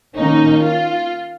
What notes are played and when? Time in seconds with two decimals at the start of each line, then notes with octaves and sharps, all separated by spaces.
0.16 D#3 A#3 C#4 D#4
0.63 F4